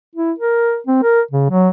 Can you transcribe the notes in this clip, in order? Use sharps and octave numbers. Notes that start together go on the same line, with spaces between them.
E4
A#4
C4
A#4
C#3
F#3